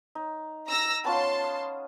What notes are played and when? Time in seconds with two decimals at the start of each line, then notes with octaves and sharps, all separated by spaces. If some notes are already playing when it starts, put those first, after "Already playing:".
0.15 D#4
0.67 A#5 E6 A#6
1.05 B3 C#4 F4 A5 C6
1.44 D#6